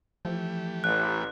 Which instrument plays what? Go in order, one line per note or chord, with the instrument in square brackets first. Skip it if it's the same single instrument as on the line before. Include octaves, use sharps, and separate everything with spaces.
[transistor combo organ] E3 A3 G4 [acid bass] F3
[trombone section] A1 [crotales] F#6